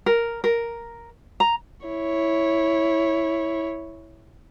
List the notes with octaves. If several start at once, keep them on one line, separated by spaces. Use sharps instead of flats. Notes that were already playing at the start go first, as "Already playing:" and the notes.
A#4
A#4
A#5
E4 C#5